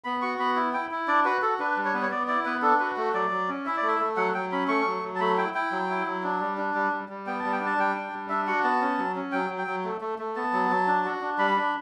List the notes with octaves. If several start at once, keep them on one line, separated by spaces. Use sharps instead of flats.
B3 B5
F#4 C#6
B3 B5
E4
E4 G5
E4
D4 D5
F#4 B4
F#4 A4
D4 B4
G3
C#5
B3 B4
C#5
B3 D5
E4 D5
B3 B4
D4 A4
F#4 B4
A3
F#3 D5
F#3
C#4
E4 E5
D5
A3
E5
A3
F#3 F#5
F#3 G5
C#4 B5
A3 C#6
F#3
F#3
A5
A3 B5
E4 G5
E4 G5
F#3
E4
F#3
D4
G3
D4
G3
G3
G3
B3 G5
A5
G3
G5
D4
A5
G3 G5
D4
G3
D4 E5
F#4 F#5
B3 A5
C#4
F#3
C#4
F#3 G5
F#3
G5
F#3
A3
A3
A3
B3 A5
F#3
F#3
D4
F#4
D4
G3 B5
D4